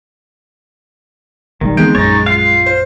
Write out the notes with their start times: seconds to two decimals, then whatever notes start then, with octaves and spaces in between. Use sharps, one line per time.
1.61 A#1 D#3 G3
1.77 E3 G#3 B3 C4 G6 D7
1.95 A#1 F#2 D#4 C#5 A6
2.26 F4 F5 C7
2.66 C5